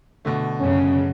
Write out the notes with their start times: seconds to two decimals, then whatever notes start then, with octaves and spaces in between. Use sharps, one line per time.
0.25 B2 D3 A3
0.60 F#2 C#3 C#4